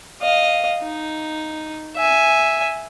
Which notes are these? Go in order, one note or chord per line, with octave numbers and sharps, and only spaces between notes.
D#5 F5
D#4
E5 G#5